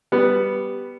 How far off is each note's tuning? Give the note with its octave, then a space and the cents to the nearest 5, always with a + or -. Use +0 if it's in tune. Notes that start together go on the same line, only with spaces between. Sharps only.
G3 +0 B3 +0